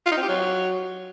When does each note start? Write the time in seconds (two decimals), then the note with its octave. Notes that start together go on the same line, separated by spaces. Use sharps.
0.06 F4
0.12 D#4
0.17 C4
0.23 G4
0.28 F#3